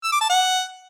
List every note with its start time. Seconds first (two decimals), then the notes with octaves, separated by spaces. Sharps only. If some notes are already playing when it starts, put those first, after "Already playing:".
0.04 E6
0.12 D6
0.21 A5
0.30 F#5